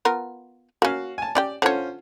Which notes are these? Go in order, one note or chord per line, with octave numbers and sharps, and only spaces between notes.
B3 F4 A#4
A#3 C#4 F#4 F5
G#5 A5
C#4 G4 D5 G5
D3 C#4 F4 C5 C#5